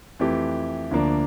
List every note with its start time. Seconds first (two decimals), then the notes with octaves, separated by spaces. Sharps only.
0.19 F2 E3 A3 E4 G4
0.91 D2 D3 F3 A#3 D4